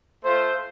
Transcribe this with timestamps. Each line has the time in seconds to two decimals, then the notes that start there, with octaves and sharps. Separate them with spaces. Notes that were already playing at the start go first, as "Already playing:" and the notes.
0.23 A3 F4 C5